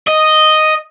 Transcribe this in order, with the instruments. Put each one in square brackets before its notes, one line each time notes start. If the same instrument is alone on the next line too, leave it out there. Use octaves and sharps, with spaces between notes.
[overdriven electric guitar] D#5